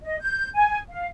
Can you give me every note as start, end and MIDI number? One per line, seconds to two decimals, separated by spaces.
0.02 0.16 75
0.20 0.49 91
0.54 0.78 80
0.90 1.07 77